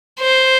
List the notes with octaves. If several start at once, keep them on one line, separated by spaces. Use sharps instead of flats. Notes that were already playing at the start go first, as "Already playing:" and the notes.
C5